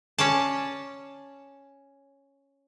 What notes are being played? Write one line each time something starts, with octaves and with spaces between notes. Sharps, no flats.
C#4 C#5 D5 A5